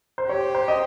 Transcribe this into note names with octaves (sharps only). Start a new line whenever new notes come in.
C5
G4 C#5
C5
D#5